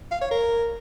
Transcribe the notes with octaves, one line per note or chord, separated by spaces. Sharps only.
F5
C#5
A#4